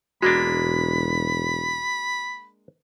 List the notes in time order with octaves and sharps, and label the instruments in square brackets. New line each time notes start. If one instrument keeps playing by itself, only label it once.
[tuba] E1 [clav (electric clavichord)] G#3 A#3 D4 [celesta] F#4 [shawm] B5